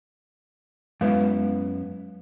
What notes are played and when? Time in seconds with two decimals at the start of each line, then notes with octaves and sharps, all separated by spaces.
1.01 F#2 G#3 B3 E4